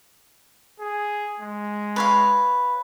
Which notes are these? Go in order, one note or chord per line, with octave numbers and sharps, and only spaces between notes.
G#4
G#3
B4 C#5 F5